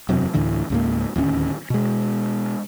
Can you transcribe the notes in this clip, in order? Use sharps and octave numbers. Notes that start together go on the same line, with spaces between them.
E1 F#2 C3 F#3
D2 A2 D3 E3
C#2 G#2 A#3
D1 D#2 C4 C#4
B2 G#3